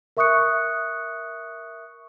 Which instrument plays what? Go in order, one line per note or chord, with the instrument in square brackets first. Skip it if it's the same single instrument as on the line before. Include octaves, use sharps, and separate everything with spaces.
[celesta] A#4 E5 C#6 D#6 F#6 C#7